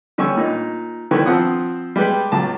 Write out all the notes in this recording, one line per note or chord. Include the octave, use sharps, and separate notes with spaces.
D3 G3 C#4 G#5 C#6 E6
A#2 D#4
D3 D#3 G3 E4 B4 C#5
F3 C4 F#5 D#6
G3 G#3 G4 B4 G5
C#2 F#3 A5